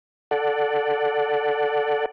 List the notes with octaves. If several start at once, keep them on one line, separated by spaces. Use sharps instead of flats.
A4 D5 F#5